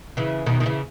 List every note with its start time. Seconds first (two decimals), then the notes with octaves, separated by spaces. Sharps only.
0.17 C#3 E3
0.46 B2 D#3
0.60 D#3
0.66 C#3 E3